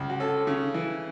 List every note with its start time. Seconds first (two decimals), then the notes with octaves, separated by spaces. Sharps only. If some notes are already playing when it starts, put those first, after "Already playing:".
Already playing: C#2
0.10 F#4
0.20 C#4 A4
0.47 C#3
0.74 E3